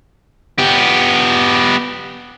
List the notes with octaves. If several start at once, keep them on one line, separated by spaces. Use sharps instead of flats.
B3 G4